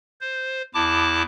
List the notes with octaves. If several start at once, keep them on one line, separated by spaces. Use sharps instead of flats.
C5
E2 E4 A5 D6